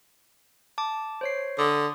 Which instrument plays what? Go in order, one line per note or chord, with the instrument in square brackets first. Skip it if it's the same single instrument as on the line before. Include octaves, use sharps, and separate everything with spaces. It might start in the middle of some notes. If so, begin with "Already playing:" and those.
[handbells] A5 D6
C5 C#5 C7
[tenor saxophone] D3 [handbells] D#6